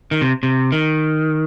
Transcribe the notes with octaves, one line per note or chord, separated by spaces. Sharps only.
D#3
C3
C3
D#3